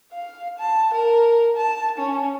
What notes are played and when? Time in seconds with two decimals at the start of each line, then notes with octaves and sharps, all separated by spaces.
0.12 F5
0.59 A5
0.94 A#4
1.56 A5
1.98 C#4